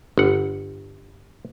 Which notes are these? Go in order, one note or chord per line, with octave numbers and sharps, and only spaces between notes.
G1 F#5